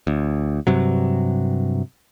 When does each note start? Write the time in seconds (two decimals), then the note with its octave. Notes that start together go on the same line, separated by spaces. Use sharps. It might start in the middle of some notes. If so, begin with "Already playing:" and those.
0.07 D2
0.67 G2 C3 F#3